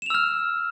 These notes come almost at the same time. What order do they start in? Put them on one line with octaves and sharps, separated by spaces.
E7 F7 E6 F6